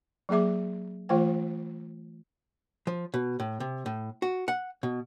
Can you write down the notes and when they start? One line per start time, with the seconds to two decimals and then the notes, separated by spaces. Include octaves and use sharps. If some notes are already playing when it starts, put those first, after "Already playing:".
0.29 F#3 A#3 G#4 E5 D6
1.09 E3 A3 F4 C5 G5
2.87 F3
3.14 B2
3.40 A2
3.60 C3
3.86 A2
4.22 F#4
4.48 F#5
4.83 B2